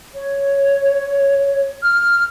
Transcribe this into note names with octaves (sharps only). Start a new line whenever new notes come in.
C#5
F6